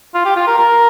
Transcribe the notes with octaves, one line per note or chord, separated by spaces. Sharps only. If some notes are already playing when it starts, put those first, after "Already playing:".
F4
G4
F4
A#4
A#4